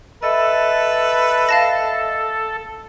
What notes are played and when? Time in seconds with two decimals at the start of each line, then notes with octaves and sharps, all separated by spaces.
0.23 A4 B4 D#5 E5
1.49 F5 A5 A#6